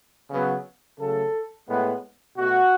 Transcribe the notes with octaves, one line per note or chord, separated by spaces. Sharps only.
C#3 F#3 B3
C#3 F#3 A3 A4
A2 G#3 B3
B2 A3 F#4